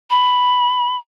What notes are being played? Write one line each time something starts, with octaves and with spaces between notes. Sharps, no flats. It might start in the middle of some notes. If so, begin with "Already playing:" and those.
B5